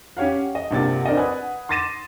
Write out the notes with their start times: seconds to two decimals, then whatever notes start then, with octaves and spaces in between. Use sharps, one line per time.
0.17 C#4 G4 C#5 F5 F#5
0.55 D#5
0.71 A#1 G2 C3 A#3 F#5 A6
1.05 C4 D4 A#4 D5 D#5
1.17 B4 F#5 G#5 D#6
1.69 C6 D6 A6 A#6 D#7 E7